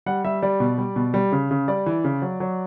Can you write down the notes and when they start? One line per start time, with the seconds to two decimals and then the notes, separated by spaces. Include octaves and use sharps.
0.06 G3 F#5
0.24 G3 E5
0.42 G3 D5
0.60 B2
0.78 G3
0.96 B2
1.14 G3
1.32 C#3
1.51 C#3
1.68 G3 D5
1.86 E3
2.04 C#3
2.22 F#3
2.40 F#3